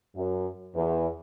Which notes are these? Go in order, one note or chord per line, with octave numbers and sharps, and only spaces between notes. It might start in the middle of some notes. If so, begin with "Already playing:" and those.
F#2
E2